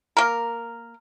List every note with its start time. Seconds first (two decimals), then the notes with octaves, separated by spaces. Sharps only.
0.17 A#3 A#4